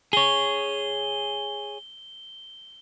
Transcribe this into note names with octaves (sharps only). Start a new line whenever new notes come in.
G#4 C#5 G7